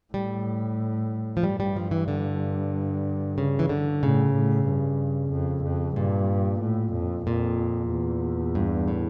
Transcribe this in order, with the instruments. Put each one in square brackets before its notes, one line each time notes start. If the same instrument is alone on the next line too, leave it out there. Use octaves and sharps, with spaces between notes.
[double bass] A2 [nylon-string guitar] G3
[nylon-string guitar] F3
[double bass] G2 [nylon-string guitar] G3
[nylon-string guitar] G3
F3
E3
D3
C#3
E3
D3
[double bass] A2 [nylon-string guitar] C#3
[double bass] A2
G2
F2
F2
[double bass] G2 [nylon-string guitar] A#2
[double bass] A2
F2
[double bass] F2 [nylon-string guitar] A#2
[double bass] E2
[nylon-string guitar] G2
A2